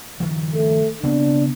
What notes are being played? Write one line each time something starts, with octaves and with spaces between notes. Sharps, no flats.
G2 D#3 F3
A3
C#3 B3 C4 D4